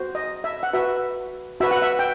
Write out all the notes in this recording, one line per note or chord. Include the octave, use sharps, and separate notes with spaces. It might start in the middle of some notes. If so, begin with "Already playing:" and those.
Already playing: F#4 C5
D#5
E5
F#5
F#4 B4 E5
F#4 B4 E5
F#5
E5
G5